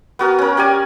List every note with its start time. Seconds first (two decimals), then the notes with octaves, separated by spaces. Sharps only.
0.19 B3 F#4 A#4
0.39 C#4 A#4
0.57 C#4 G4 D5 G#5